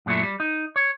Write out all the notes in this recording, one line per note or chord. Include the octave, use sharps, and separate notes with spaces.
F#2 A#2 F#3 A3 E4
G3
D#4
C#5